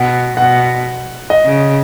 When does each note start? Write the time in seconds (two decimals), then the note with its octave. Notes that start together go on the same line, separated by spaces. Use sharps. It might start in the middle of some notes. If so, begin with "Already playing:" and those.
Already playing: B2 F#5
0.37 B2 F#5
1.30 D#5
1.45 C#3